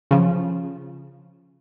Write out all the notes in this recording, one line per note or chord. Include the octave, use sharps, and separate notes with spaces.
C#3 F3